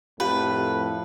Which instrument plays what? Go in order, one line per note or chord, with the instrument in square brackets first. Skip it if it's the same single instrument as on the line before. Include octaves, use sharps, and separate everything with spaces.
[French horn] F2 [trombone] A2 [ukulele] F4 G4 A#4 [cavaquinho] B4